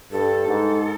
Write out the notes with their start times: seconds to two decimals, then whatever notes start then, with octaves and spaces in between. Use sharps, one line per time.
0.12 G2 A4
0.47 G#2